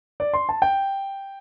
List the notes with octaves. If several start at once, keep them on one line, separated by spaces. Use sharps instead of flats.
D5
C6
A5
G5